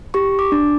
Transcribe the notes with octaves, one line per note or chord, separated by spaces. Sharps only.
G4 C#6
D6
D4